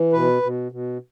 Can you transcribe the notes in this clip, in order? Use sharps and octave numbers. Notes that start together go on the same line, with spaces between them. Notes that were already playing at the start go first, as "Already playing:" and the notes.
Already playing: E3
B2 B4
B2
B2